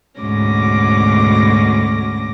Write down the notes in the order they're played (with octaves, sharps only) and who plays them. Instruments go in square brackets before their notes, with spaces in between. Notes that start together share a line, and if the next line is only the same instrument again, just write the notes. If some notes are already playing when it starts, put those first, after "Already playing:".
[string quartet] D2 G#2 B2 C#4 D6 A#6